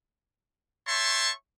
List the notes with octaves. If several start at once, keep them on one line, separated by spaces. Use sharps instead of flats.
C#5 E5 G5 A5 C6 C#6